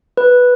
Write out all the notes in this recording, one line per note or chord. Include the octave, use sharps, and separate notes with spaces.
B4